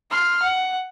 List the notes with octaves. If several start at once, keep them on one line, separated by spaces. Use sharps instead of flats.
C6 F6
F#5